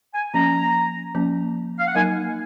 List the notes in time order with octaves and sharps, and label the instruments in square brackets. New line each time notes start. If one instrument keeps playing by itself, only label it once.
[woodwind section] G#5
[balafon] F3 A#3 C#4 [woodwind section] A#5
[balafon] F3 A#3 C#4
[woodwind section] F5
F#5
[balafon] F#3 A#3 D#4 A#4 D#5 [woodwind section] G#5